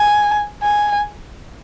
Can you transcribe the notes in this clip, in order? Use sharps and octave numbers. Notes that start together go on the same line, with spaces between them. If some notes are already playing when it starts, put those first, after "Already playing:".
Already playing: G#5
G#5